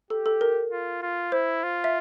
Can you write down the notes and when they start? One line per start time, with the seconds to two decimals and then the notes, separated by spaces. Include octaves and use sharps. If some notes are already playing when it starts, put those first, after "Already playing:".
0.10 G4 A4
0.26 A4
0.41 A#4
0.71 F4
1.02 F4
1.32 E4 C5
1.64 F4
1.84 E5